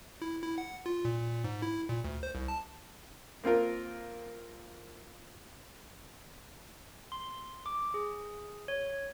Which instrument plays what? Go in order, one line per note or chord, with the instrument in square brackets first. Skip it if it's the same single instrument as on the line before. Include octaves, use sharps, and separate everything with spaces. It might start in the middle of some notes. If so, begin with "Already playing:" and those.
[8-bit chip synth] E4
E4
F#5
F4
A#2
G#2
E4
A#2
D2
C5
C2
A5
[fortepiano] A#3 C4 F4 A#4
[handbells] C6
D6
G#4
C#5